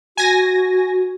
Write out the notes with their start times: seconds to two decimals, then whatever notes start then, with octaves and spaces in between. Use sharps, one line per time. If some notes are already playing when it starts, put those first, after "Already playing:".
0.17 F#4 G#5 A#6